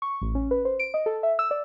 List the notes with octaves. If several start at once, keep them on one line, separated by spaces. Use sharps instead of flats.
C#6
A1
C#4
B4
C5
D7
D#5
A4
E5
E6
D5